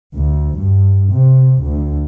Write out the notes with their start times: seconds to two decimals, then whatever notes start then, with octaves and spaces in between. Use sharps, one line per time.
0.16 D2
0.59 G2
1.13 C3
1.63 D2